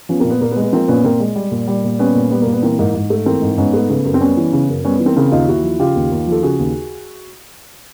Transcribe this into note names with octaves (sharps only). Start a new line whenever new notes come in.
F3 B3 C#4
A#2 A#3 C4
B3
A#2 A#3
B3
G#3
B3
F3 A#3 C4
A#2 B3 C#4
A#2 A#3 C4
G#3
G3
A#2
G3
A#2
G3 B3 C#4
A#2
G3 B3
A#3
A#2
B3
E3 A#3 C4
G#2 A#3
G#2
A3
E3 A#3 C4
G#2
G#2 B3 C#4
A3 B3
C#3 B3
F#2
C4
G3 B3 C#4
E3
C#3
F#2
G3 B3 C#4
E3 B3
A#3 C4
C#3 A#3 C4
D#2 D#4 F4
D#2 E4 F#4
F3
C#3 F4 G4
D#2
D#2
F3 A4
C#3 F#4 G#4
D#2